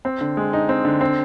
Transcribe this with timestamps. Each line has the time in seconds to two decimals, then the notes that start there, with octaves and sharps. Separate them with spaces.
0.05 C4
0.21 D3
0.37 G#3
0.53 D#4
0.69 C4
0.85 D3
1.01 C4